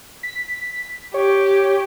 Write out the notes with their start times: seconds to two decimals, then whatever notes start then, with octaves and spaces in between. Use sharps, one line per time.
0.23 B6
1.14 G4 C#5